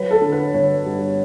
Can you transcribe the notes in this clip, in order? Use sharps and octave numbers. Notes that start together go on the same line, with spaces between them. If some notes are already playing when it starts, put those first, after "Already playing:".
Already playing: F#3 B4
A4
D3
B4
G1 C#5
G2